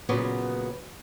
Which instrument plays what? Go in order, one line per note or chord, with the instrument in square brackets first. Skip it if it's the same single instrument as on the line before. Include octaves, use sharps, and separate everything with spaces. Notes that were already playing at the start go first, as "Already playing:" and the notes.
[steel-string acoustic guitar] A#2 C#3 F#3 B3